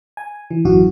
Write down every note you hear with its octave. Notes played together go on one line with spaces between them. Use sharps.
G#5
E3
G#1 F#2 E3 F#4